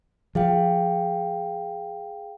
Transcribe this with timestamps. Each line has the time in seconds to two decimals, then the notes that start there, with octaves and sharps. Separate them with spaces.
0.35 F3 G#4 F5 G5